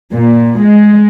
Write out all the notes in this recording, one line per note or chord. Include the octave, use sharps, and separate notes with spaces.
A#2
G#3